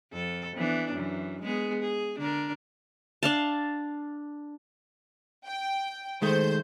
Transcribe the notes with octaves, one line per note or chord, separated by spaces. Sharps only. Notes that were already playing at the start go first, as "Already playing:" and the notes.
F2 A4
E3 B3 D4
F#2 E3
G#3 B3 G#4
G#4
D3 D4 A#4
D4 F5 A5
G5
D#3 G#3 A3 C5 G6